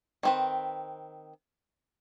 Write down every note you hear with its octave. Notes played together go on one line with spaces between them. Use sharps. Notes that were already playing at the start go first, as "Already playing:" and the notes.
D#3 C4 B4